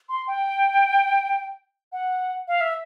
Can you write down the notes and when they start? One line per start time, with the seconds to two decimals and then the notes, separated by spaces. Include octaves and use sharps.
0.09 C6
0.27 G5
1.92 F#5
2.48 F5
2.61 E5